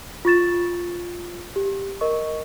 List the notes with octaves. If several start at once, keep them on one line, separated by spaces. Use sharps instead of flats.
F4 C#6 A6 E7
G4
A#4 D#5 C#6